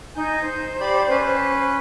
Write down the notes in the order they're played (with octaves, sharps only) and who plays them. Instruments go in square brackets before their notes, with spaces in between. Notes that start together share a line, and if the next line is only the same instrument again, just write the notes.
[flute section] D#4 G#5 [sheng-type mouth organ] G6
[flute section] C5
[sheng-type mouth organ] G4 D5 B5
C#4 B4